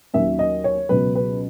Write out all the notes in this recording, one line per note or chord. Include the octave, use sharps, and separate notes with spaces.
D#2 D#3 F#3 C#4 E5
D#5
C#5
C#2 B2 F#3 B4
B4